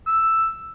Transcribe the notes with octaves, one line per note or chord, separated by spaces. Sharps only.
E6